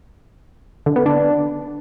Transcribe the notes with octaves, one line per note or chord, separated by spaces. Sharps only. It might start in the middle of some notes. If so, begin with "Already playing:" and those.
D3
B3
D4